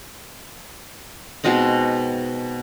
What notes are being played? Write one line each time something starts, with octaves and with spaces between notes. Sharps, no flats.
B2 G#3 C4 D#4